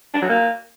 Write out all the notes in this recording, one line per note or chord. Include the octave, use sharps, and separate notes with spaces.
D4
F#3
A#3